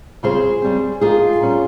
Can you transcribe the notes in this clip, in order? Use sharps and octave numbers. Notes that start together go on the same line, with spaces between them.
C#3 G3 C4 F4 G#4 C5
C#3 G3 C4
F3 A#3 D#4 F4 G#4
A#2 G3 C#4